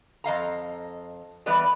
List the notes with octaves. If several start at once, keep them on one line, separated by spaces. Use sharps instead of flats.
F2 D#5 F5 A#5
E3 G3 B3 B4 D5 D#5